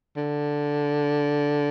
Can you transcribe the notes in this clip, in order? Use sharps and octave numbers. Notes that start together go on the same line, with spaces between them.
D3